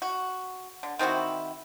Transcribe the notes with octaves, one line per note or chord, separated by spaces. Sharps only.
F#4
D3
D#3 C4 E4 F#4